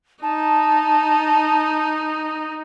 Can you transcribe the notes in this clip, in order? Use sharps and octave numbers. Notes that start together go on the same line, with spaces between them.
D#4 A5